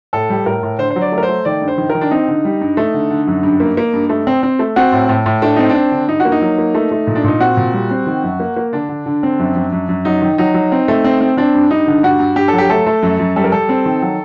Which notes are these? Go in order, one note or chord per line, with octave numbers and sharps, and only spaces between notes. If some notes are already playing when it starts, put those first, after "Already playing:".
A2 A4
G3
A2 A#4
A2
D3 C5
C5
F#3
D5
A3
A#4
C5
A3
D#3 D5
G2
C5
D#3
D#3 A#4
D4
C4 D#4
D3
G3
G2
A3
D3
D3
F#2
G2
A#3
A#3
G2
A3
C4
C4
A3
C4 F#4
A2
A2
A2
A3 D4
C4 D#4
D4
C4
D3
G2 D#4
F#4
A#3
D#4
F#3
A#3
A3
A3
A#2
D4
A#2 D#4
C4 F#4
A#2
G3
C4
D#3
F#2
A#3
A#3
D3 D4
D3
D3
C4
F#2
F#2
F#2
F#2
F#3 D#4
D#3
F#3 D#4
F#3
C4
A3
C4
C4
C4 D4
G2
G2 D#4
D3
G2 F#4
G2
G2 G4
F#3 A4
G4
A3 A4
A3
F#2
F#2
G3 A4
A#4
G3 A4
C4
D#3
F#3